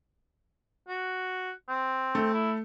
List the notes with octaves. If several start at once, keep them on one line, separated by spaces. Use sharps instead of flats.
F#4
C4
A3
E4